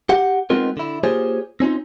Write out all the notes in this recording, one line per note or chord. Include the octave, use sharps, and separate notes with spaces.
G4 F#5
G#3 B3 C4 D#4 F4 A#4
D3 E4
A#3 F4 G4 G#4 C5 C#5
C4 C#4 D#4 F4